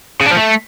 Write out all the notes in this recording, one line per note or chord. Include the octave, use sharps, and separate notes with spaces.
C#3
D4
F3
A3